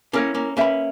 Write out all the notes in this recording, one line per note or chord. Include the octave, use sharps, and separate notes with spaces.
A#3 C#4 E4 A#4 C#5
A#3 C#4
A#3 C#4 B4 E5 B5